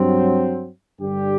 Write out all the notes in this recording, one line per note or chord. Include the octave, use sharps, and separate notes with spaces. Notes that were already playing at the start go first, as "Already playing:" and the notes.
Already playing: G2 F#3 C4
G2 D3 G3 D4 G4